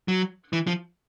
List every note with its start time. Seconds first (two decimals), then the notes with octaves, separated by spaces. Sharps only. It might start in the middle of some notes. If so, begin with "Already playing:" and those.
0.08 F#3
0.53 E3
0.67 F3